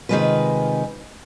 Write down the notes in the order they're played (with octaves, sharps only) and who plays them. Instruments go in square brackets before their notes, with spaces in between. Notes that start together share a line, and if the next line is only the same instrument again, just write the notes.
[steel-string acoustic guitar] C3 D#3 E3 G#3 F4 B4